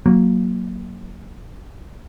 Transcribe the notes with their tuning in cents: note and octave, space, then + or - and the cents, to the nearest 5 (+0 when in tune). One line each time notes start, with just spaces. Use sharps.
F#3 +0 A#3 +0